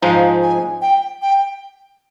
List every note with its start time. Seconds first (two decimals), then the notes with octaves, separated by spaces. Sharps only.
0.02 G#2 F3 G#3 D#4 F5
0.42 G#5
0.82 G5
1.22 G5